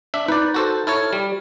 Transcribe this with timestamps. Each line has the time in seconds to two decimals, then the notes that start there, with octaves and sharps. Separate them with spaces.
0.14 D4 E5
0.28 D#4 B4 D5
0.54 F#4 A4 C5
0.87 E4 A4 C#5 F6
1.13 G3